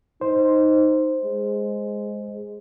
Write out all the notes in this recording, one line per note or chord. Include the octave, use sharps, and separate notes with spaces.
D#4 C5
G#3